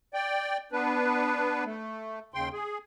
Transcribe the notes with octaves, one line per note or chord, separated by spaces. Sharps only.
D5 G5
B3 D4 B4
A3
D#2 C#3 G5 C6
G#4